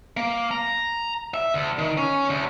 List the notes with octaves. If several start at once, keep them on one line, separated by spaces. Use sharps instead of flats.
A#3
A#5
E5
D2
D#3
C#4
D2